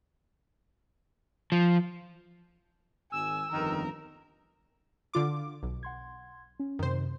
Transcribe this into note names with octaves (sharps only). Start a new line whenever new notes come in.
F3
G#1 G#5 E6
G1 F2 D#3 A#4
D3 F4 D6
B1
F#5 C6 G#6
C#4
F#2 C3 D#3 C5